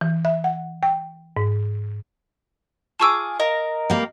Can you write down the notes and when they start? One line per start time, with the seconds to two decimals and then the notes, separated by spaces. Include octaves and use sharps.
0.01 E3
0.25 E5
0.44 F#5
0.83 G5
1.37 G#2
3.00 F4 G#4 A5 C#6 D6 E6
3.40 A#4 D#5 F5
3.90 G3 A#3